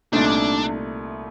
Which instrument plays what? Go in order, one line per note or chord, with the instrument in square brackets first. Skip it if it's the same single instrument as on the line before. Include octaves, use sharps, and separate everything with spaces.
[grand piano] C2 A#2 A3 D#4 [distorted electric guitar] D4